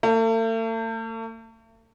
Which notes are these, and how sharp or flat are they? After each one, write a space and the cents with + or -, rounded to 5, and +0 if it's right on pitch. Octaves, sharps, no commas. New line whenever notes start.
A3 +40